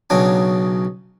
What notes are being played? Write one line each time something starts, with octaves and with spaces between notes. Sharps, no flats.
B1 C#3 F#3 D4 G#5